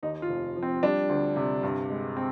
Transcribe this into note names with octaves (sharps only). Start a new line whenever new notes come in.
D#2 D#4
F4
F1
F3
C4
G3 D4
D2
C3
G2
G#3
C4